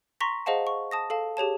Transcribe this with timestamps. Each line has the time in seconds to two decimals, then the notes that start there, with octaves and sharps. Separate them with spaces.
0.20 A#5 C6 C#6 A#6 B6
0.46 G#4 C5 D#5 F5 F#5 A5
0.67 C#6
0.91 A5 D#6 A#6
1.10 A4 F5 A5
1.37 G4 G#4 C#5 A5